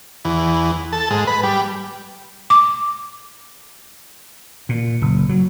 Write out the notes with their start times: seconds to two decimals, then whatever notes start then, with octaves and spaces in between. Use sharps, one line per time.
0.25 E2
0.93 A4
1.10 G#2
1.27 B4
1.43 G3
2.50 D6
4.69 A#2
5.02 F#1
5.29 F#3